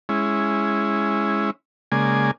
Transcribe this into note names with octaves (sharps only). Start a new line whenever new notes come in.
G#3 C#4 E4
C#3 G#3 A#3 D5 G#5